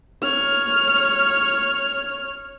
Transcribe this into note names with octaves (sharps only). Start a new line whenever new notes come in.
C#5 F6